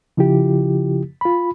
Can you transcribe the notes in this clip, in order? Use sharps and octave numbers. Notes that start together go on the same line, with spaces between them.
C#3 F3 E4 F4 G4
F4 B5